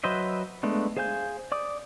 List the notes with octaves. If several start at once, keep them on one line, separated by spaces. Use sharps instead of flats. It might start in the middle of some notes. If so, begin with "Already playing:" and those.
F#3 B4 C5 D#5 E5
G#3 A3 B3 D4
G#4 C5 F5 G#5 G6
D5 D6 D#6